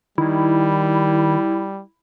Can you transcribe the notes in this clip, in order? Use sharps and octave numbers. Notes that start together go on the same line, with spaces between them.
D#3 G3 E4